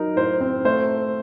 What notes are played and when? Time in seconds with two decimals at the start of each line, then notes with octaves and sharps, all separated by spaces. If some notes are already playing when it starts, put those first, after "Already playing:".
Already playing: F#3 D#4 A#4
0.16 A2 C5
0.41 C4
0.65 A3 C5